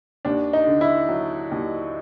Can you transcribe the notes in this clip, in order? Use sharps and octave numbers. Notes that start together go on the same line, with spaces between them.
D#2 D4
D#4
D3
E4
F#3
D#2